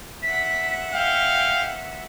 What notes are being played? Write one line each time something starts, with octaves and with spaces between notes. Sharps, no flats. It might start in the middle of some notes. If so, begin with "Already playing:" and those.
E5 F#5 B6
F5 G5